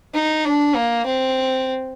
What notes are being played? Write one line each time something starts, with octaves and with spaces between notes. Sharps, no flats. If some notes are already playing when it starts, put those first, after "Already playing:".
D#4
D4
A#3
C4